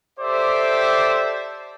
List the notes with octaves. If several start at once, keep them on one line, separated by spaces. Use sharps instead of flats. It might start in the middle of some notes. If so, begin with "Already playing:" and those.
G4 A4 C5 D5 E5 D6